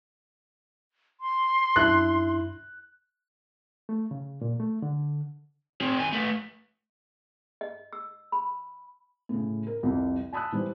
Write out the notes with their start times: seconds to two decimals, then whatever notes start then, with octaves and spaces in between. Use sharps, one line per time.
1.20 C6
1.76 F#2 D4 E4 F#6
3.89 A3
4.11 C#3
4.41 A#2
4.60 A3
4.82 D3
5.81 C4 G#4
5.97 D#3 G#5
6.12 A3 B4
7.61 D#5
7.93 E6
8.32 B5
9.29 A2 C#3
9.67 A#4
9.83 C2 F2
10.33 G#5 A5 B5 D#6 E6 F#6
10.52 E3 G3 C5